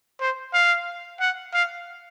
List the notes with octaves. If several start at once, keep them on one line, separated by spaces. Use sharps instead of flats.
C5
F5
F#5
F5